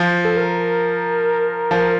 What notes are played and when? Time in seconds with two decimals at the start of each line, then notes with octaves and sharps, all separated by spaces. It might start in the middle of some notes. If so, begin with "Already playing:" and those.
Already playing: F3
0.25 A4
0.37 A#4
1.71 F3